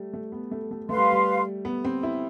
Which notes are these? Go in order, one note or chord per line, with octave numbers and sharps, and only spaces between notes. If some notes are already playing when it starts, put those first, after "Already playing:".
Already playing: G3 A3
A3
B3
A3
A3
A3 B4 F5 C6
G3
G3
B3
C4
E4